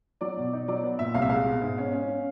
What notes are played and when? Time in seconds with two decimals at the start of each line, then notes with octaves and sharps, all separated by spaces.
0.21 F#3 D5
0.37 B2
0.53 D#4
0.68 F#3 D5
0.84 B3
0.99 A#2 E5
1.14 C2 F5
1.22 E5
1.29 G#3 F5
1.46 B2
1.61 G#2
1.78 C#4
1.93 C#4
2.09 C#4